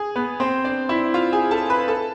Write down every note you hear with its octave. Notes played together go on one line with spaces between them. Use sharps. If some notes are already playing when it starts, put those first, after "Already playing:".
Already playing: G#4
B3 B4
C4 C5
D4 D5
E4 E5
F4 F5
G#4 G#5
A4 A5
B4 B5
A4 A5